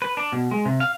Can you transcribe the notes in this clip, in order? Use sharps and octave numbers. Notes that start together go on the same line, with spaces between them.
B4
D4
B2
G#3
C3
F5